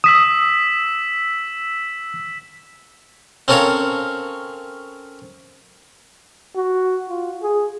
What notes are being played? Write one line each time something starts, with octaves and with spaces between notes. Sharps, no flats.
D#6 E6 B6 E7
C4 C#4 A4 A#4 C#5 F5
F#4
F4
G#4